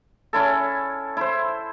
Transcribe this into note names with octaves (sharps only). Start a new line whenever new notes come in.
C#4 E4 A4
E4 C5